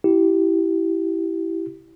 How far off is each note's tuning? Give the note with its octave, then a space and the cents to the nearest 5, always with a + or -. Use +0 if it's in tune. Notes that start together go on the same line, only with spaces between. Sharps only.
E4 +0 G4 -20